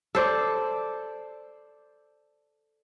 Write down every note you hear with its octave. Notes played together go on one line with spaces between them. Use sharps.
A4 C5 D5